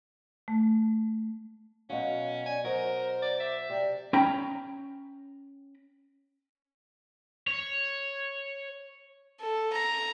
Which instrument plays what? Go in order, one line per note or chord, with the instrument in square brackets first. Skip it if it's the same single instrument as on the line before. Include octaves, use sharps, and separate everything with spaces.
[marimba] A3
[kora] B2 F#3 [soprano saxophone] C#4 [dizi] F5
[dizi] D5 [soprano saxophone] G#5
[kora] F#3 D#5 [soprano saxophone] A#4 [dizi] C5
[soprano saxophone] D5
E5
[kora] C3 [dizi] D5
[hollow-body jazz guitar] C#4 G5 A#5 B5
[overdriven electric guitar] C#5
[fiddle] A4
A#5